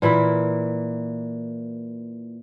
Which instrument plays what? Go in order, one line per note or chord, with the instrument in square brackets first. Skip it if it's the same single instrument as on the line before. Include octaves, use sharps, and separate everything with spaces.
[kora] A#2 E3 A#3 E4